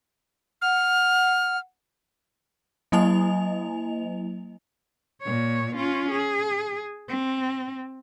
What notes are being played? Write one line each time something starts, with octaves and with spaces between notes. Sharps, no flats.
F#5 F6
F#3 A#3 E4 D#5 G#5 F7
A#2 C#5
C#4 F4
G#4
C4